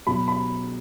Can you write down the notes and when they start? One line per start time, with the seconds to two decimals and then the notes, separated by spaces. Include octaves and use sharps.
0.07 B2 F#3 B5
0.28 B5